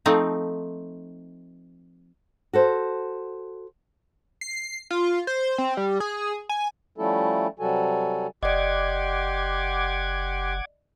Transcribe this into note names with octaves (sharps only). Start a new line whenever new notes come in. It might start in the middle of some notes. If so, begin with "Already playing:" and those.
F3 A3 C4 D#4
F#4 A4 C5
C7
F4
C5
C4
G3
G#4
G#5
F3 G3 A3 C#4 E4 A4
C3 F#3 G3 F#4 A4 G#5
F#1 G4 D5 D#5 F#5 C6 D6 G#6